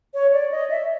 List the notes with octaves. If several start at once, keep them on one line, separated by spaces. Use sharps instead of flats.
C#5
D5
D#5
E5